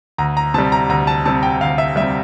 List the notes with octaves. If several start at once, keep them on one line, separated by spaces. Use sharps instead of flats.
D2 A#5
A#5
C3 G3 A5
A#5
D2 A#5
A5
C3 G3 A5
G5
D2 F5
E5
C3 G3 E5